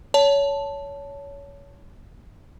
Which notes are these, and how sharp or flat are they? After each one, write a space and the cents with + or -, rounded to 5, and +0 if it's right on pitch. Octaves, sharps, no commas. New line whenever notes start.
C#5 +25 A5 +0